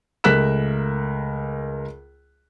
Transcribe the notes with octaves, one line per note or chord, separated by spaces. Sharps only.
C#2 A3 A#4 F#6 B6 E7